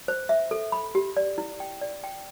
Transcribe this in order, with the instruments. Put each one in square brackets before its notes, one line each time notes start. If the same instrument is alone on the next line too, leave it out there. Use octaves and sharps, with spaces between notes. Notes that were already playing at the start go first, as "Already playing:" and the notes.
[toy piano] C5
E5
A4
B5
G4
D5
E4
G5
D5
G5